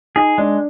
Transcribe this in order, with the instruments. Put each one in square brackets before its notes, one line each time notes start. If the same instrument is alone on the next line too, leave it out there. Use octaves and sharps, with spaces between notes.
[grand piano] D#4 [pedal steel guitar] G#4
[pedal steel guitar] G#3 [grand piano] D4